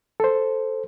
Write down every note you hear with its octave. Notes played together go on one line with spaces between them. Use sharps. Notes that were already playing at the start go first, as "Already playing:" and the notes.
A4 C5